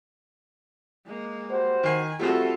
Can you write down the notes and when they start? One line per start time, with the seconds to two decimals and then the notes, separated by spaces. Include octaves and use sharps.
1.06 G#3 A#3
1.50 G3 F#4 C5
1.84 D#3 G#5 C7
2.20 G3 A3 C4 F4 F#4 A4